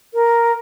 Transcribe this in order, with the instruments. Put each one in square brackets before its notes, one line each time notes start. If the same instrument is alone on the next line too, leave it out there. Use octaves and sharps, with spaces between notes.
[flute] A#4